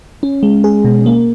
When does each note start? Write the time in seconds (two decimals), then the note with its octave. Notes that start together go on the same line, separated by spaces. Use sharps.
0.23 C#4
0.43 G#3
0.64 G#4
0.85 B2
1.06 A#3